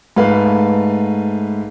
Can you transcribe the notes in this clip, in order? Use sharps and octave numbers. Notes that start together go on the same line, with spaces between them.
G#2 A3 B4 F5